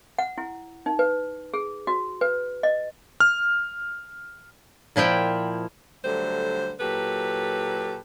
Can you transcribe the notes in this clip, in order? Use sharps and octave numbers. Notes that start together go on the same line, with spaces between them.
F#5
E4
D#4
B4
G#4
F#4
B4
D#5
F6
A#2 F3 E4 G5
D3 F#3 G3 A3 C5
A#2 F#3 G4 A4 B4